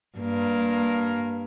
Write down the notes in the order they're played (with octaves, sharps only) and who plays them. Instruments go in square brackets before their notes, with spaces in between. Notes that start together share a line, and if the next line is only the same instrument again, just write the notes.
[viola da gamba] G2 A#3